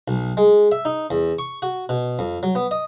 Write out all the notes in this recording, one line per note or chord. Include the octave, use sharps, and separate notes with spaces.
B1
G#3
E5
D#4
E2
C#6
F#4
B2
F2
F#3
B3
D#5